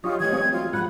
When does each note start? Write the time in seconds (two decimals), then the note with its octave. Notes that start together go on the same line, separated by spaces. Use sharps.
0.04 F#3 D4 F4 G4 C#5 D#5
0.20 E3 A3 G#6
0.32 G#3 C4 C5
0.52 F#3 F4
0.73 G#2 F3 G#3 F4 F#5 B5